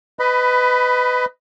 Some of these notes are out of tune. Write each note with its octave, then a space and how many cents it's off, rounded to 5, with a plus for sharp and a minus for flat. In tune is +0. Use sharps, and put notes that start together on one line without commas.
B4 +20 D#5 +0 B5 +0